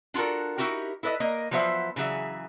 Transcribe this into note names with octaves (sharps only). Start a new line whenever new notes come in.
D4 F4 F#4 A4 A#4
D#4 E4 F#4 G4 A#4
E4 A4 B4 D5 D#5
A#3 A#4 D#5
F3 F#3 B3 C5 E5
C#3 E3 F#3 G#4 E5